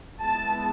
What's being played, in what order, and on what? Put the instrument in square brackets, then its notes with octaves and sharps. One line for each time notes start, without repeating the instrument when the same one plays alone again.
[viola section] G#3 B3 E4 A5